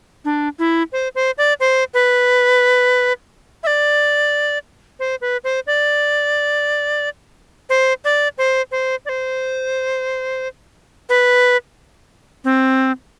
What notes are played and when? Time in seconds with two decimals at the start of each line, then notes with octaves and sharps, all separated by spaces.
0.25 D4
0.59 E4
0.93 C5
1.15 C5
1.38 D5
1.60 C5
1.94 B4
3.63 E5
3.67 D5
5.00 C5
5.21 B4
5.44 C5
5.67 D5
7.70 C5
8.05 D5
8.38 C5
8.71 C5
9.06 D5
9.09 C5
11.09 B4
12.44 C4